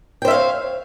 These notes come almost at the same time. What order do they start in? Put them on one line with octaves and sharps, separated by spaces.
G5 C5 E5 F5 C#5